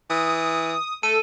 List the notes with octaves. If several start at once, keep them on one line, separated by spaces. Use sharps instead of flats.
E3 D#6
A3 A4 D#7